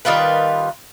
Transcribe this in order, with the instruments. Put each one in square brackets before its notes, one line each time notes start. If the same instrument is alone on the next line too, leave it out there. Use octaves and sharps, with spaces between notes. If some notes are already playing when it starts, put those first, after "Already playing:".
[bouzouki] D#3 G3 F4 B4